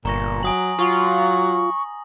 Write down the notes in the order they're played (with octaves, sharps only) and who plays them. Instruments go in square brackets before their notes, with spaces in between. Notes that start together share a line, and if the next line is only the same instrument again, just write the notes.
[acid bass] G1 [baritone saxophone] A#2 [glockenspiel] A#5 C#6 A#6
[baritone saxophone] F#3 [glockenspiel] G#5 D#6 F#7
[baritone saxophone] F#3 [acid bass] F4 [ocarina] C#6